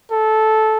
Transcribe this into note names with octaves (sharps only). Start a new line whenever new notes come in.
A4